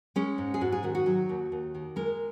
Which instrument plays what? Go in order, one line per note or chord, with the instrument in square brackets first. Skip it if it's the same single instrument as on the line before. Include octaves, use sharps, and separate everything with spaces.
[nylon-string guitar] G#3 C#4
G#2
G#4
G#2 F#4
G#4
D#3 F#4
F#4
F#3
D#2
D#2
D#3
G#3 A#4